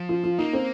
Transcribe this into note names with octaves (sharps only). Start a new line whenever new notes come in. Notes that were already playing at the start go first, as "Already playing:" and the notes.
Already playing: F3
F4
F4
A#3 D#4
C4